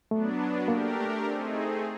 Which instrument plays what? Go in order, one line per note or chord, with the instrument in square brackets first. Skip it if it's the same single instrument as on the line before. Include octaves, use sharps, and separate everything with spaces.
[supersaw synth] F#3 B3 D4 [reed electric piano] A3
[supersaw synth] A3 D4 G4 A#4 [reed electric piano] A#3
[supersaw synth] A3 C4 D#4 G#4